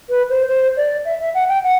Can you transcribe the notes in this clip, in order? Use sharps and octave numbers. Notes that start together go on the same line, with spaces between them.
B4
C5
C5
D5
E5
E5
F#5
G5
F#5